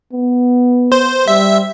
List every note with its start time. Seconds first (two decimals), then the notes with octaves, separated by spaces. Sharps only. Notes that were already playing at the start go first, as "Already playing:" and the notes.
0.13 B3
0.92 C5
1.28 G3 E5